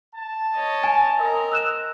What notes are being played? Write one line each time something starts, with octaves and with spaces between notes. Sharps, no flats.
A5
C#5 D#5
G#5
C4 A#4 D#5
E6 F#6 E7